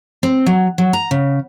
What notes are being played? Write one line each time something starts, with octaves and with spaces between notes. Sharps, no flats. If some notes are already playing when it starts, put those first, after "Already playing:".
C4
F#3
F#3
A#5
C#3